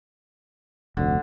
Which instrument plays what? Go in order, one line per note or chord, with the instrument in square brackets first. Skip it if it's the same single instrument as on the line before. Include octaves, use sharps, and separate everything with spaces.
[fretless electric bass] F1 D2 [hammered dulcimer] D3